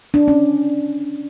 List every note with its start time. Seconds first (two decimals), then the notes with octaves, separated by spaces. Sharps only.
0.14 D4
0.28 C#4